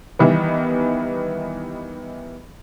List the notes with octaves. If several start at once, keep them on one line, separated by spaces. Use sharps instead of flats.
D#3 E3 G3 B3